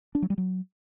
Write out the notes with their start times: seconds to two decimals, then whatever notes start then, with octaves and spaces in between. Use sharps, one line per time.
0.15 D4
0.22 F#3
0.30 G3
0.38 F#3